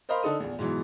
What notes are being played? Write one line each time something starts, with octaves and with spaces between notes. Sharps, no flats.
A#4 C5 D#5 F5 B5 C6
D3 D#4 A4 D#6
A#1 E2
G#2 B2 E3 F#3